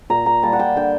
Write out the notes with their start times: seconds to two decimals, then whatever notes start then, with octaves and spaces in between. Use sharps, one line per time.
0.10 A#2 A#5
0.26 A#5
0.43 G3 A#3 A5
0.53 F#5
0.59 G5
0.76 D3 G5